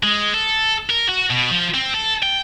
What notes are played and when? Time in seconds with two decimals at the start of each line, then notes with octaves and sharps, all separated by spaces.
0.03 G#3
0.34 A4
0.90 A#4
1.09 F#4
1.30 B2
1.51 F3
1.74 C4
1.94 A4
2.23 G5